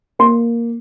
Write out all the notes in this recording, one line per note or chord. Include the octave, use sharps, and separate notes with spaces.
A#3 C6